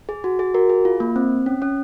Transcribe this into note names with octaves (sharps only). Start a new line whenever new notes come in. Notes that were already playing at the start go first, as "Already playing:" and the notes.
G#4
F#4
G#4
F#4 A#4
G#4
F4
A#3
C4
C#4
C#4